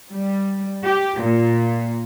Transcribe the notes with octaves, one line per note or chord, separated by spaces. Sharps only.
G3
G4
A#2